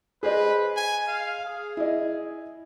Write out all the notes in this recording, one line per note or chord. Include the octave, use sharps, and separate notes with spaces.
G#4 B4 C5 D#5
G#5
F5
G#4
E4 D#5